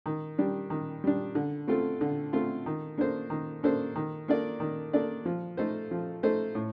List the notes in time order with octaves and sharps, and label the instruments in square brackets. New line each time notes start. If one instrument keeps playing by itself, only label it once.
[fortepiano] D#3
G3 D4
D#3
G3 D4
D3
A3 C4 F4 A4
D3
A3 C4 F4 A4
D#3
A#3 D4 A4 C5
D#3
A#3 D4 A4 C5
D#3
A#3 D4 A4 D5
D#3
A#3 D4 A4 D5
F3
A3 D#4 A4 C5
F3
A3 D#4 A4 C5
A2